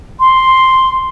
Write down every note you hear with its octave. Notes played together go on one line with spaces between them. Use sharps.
C6